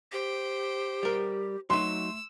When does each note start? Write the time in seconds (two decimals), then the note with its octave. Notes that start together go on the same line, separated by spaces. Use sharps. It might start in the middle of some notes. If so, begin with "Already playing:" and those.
0.12 G4 C5 G5
1.03 G3 A#4
1.70 F#3 A3 D#4 C6 E6